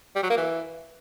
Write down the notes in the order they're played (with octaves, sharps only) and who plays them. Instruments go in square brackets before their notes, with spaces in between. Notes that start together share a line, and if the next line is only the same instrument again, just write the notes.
[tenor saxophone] G3
F#3
A#3
E3